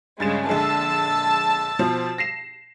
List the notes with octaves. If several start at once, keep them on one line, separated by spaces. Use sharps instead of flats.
G2 C#3 G#3 A6 E7
A#1 D3 G#3 A5 E6
B2 F3 C5
A#6 C7 E7